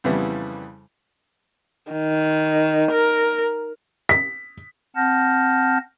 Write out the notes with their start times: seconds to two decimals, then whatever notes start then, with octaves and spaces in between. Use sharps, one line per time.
0.04 F2 C#3 E3 G3 B3
1.92 D#3
2.91 A#4
4.09 B6
4.96 C4 F#5 A5 F6 G6 A#6